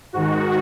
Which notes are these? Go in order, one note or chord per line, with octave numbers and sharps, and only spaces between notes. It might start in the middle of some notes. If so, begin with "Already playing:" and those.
G#2 D#3 F#4